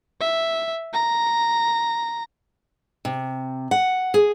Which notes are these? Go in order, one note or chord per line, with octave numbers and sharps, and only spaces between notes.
E5
A#5
C3
F#5
G#4